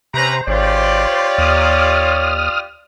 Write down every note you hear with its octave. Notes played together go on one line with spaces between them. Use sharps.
C3 C#4 B4 C5 A#5
G#1 F4 G4 C#5 D5
D#2 D#6 F6